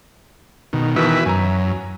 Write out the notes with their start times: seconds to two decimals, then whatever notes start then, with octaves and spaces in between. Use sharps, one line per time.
0.73 B2 D#3
0.96 B2 D#3 E3 B4 E5
1.26 F#2 G#5 A#5